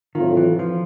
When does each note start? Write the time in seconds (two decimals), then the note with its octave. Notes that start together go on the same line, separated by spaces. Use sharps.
0.15 A2 D#3 F#3 A3 C4 F4
0.37 E3
0.59 F3